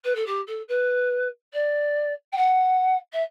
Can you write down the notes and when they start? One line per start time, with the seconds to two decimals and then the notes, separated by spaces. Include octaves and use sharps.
0.04 B4
0.15 A4
0.26 G4
0.47 A4
0.68 B4
1.53 D5
2.32 G5
2.37 F#5
3.12 E5